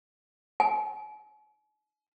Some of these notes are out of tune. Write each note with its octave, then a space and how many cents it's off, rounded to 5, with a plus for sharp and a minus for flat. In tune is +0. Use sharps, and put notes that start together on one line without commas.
G#5 +40